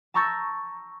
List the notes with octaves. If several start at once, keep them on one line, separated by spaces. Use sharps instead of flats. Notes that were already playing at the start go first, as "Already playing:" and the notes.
A5 A#5 C#6 E6 G6 A6